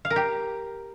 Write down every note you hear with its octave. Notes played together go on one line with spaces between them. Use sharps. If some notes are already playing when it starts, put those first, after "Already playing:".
F5
A#4
G4